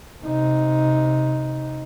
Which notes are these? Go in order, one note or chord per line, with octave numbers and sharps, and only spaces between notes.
C3 D#4